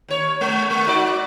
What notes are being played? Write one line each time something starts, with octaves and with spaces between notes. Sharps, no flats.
D#2 C#5
G#3
G#3
D#4 F#4 D5